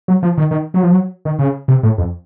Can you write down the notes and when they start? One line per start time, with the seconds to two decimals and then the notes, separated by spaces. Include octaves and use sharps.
0.08 F#3
0.23 F3
0.38 D#3
0.51 D#3
0.74 F#3
0.83 F3
0.91 F#3
1.25 D#3
1.39 C#3
1.68 C3
1.83 A2
1.98 F2